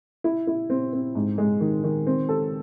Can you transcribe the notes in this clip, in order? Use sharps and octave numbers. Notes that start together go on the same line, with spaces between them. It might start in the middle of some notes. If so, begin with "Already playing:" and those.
E4
E4
C4
C4
G#2
G#3
D#3
D#3
C4
A4